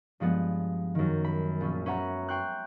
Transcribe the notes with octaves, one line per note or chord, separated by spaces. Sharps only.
G2 F3 G#3 B3
F#2 D#3
B5
A#1 C#4
C#4 B4 E5 F#5 A#5 C#6
G5 C6 C#6 F#6